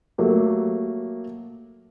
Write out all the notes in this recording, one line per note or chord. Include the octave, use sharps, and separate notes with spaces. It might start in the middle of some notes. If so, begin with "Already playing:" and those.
F#3 A3 A#3 G4